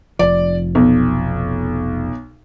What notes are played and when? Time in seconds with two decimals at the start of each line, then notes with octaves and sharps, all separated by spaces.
0.19 F1 F3 D5
0.75 B1